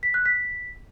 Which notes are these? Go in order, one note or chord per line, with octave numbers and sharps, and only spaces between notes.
B6
F#6
B6